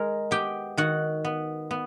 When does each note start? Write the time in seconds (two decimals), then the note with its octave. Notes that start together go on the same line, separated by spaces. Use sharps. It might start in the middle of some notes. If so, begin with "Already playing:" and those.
Already playing: G#3 A#4 A#5
0.31 B3 G4 G5
0.77 D#3 F#4 F#5
1.25 B3
1.71 B3